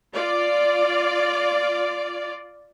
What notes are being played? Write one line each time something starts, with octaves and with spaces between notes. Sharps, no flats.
F4 D5